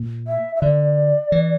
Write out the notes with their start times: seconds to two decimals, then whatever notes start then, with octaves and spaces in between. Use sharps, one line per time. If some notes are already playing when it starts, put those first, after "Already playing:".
Already playing: A#2
0.27 E5
0.56 E5
0.62 D3 D5
1.32 E3